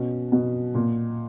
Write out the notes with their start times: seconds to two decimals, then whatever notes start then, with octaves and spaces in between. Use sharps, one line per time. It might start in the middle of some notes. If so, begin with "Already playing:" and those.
Already playing: B2 C#4
0.32 B2
0.74 A#2